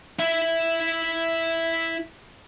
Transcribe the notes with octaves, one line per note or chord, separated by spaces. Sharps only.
E4 E5